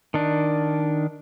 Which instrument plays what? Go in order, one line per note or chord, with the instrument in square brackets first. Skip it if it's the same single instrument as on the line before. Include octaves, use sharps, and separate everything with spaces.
[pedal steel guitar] D#3 D4